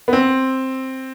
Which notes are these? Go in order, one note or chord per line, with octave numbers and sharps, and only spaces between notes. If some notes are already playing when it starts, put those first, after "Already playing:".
B3
C4